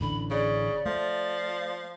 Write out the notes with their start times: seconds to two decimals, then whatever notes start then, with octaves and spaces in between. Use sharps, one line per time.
0.01 A1 D3 B5
0.31 C#3 D5
0.86 F3 A3